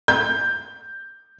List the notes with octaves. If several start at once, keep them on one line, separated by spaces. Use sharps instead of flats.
G6